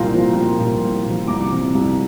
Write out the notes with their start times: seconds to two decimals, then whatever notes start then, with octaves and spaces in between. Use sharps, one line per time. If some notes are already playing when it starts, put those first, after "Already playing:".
Already playing: C2 A#2 F3 A#4 F5 G5 A#5 C6
0.14 A#2 F3
0.36 C2
0.60 A#2 F3
0.83 C2
1.05 A#2 F3
1.28 C2 A#5 D6
1.52 C3 F3
1.75 C2